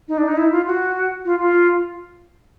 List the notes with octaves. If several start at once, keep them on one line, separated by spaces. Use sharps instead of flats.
D#4
D4
D#4
E4
F4
F#4
F4
F4